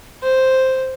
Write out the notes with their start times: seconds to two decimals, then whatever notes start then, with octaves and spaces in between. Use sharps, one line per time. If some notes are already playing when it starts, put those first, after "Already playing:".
0.22 C5